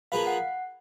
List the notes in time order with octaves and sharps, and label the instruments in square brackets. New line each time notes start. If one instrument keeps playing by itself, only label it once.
[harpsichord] F3 A#3 F4 G#4 B4 [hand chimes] F5
[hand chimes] F#5